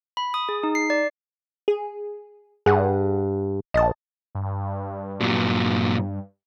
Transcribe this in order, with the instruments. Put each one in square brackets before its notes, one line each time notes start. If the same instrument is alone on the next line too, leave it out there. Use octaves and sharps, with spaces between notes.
[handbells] B5
D#6
G#4
D#4
C7
D5
[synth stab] G#4
[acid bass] G2 [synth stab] G#4 F#5
[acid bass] A#1 [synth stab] D#5 A5
[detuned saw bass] G2
[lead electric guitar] A#2 F#3